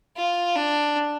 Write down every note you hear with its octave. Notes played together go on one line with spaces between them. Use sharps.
F4
D4